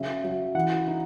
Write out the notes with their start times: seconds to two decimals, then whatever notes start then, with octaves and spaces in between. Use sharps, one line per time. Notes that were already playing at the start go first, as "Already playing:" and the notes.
Already playing: C#3 F#3 E5
0.24 F#3
0.55 E3 F#5
0.87 D#4